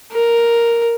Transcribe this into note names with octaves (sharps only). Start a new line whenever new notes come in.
A#4